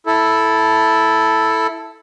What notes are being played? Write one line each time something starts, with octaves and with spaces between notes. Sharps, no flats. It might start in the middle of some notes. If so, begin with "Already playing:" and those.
E4 A4